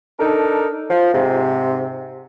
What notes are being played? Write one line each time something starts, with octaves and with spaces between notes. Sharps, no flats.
D4 D#4 A4 A#4
F3
G#2 C3